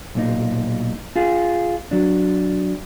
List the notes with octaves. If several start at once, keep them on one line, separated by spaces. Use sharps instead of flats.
B1 A#2 D#4
F4 G#4
F#3 D4